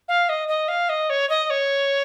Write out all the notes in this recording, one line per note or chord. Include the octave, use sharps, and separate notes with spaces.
F5
D#5
D#5
F5
D#5
C#5
D#5
C#5